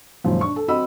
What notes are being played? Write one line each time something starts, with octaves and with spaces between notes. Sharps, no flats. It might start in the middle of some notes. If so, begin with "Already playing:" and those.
G#1 F#2 A#2 F3
D4 C#6
A4
C4 F#4 D#5 B5 E6